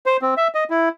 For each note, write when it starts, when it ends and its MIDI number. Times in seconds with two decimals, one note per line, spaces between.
0.06 0.17 72
0.22 0.34 60
0.37 0.48 76
0.55 0.64 75
0.70 0.89 64